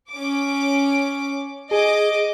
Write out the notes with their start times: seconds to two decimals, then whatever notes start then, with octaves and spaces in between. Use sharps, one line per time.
0.11 C#4 D6
1.71 G#4 D#5 D6